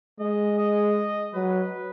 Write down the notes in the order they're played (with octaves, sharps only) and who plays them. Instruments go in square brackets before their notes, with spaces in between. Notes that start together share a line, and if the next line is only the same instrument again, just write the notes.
[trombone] G#3 [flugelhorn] D#5
[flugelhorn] D#5
[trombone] F#3 [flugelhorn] B4